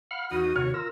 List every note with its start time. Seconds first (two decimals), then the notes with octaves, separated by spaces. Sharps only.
0.11 F5 F#5 B5 F6
0.31 E2 D#4 F#4 D#6
0.56 D#2 C3 C#5 F6
0.74 F4 A#4 A#5 E6